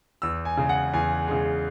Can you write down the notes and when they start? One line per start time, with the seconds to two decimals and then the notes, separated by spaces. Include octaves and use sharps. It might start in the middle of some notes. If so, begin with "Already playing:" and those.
0.22 E2 E6
0.45 G#5
0.57 C#3 G#3
0.69 F#5
0.93 E2 G#5
1.28 C#3 G#3